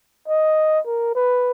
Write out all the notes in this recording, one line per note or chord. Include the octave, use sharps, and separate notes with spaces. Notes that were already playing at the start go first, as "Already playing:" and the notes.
D#5
A#4
B4